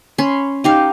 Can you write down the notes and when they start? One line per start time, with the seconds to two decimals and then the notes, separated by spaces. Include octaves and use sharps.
0.18 C#4 B5 C6
0.64 D#4 G4 F5